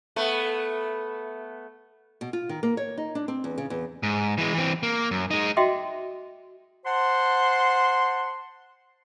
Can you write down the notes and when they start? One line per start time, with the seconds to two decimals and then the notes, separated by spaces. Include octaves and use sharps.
0.16 A3 B3
2.21 B2
2.33 F4
2.49 D#3
2.63 A#3
2.77 C#5
2.97 D#4
3.15 D4
3.28 C4
3.44 E2
3.58 C#3
3.70 E2
4.03 G#2
4.38 E3 G#3
4.54 E3 C4
4.83 A#3
5.11 F#2
5.31 G#3 D#4
5.57 F#4 D#5 E5 G5 C6 D6
6.86 C5 F#5 A5 C6